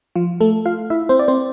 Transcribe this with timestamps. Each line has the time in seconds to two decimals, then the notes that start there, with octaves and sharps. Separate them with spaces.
0.16 F3 F4
0.40 A3 A4
0.66 F4 F5
0.90 E4 E5
1.09 C4 C5
1.19 D5
1.28 C4 C5